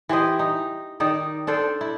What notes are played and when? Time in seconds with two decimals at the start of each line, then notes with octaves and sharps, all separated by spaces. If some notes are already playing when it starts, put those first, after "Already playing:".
0.09 E3 G4 C5 D#5
0.39 D#4
1.00 D#3 D#4 D5
1.47 D4 A4 C5 D5
1.81 E4